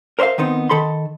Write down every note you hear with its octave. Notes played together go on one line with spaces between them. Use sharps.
A#4 C5 C#5 E5 F5
D#3 B3 C4 D#4
D#3 A4 B5 C6